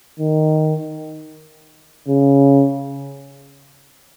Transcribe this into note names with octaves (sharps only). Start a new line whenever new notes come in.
D#3
C#3